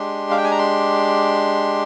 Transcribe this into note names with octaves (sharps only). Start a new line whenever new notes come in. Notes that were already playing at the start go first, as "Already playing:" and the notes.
Already playing: G#3 D4 G4 C6
F5
G5
G#5
A#5
C6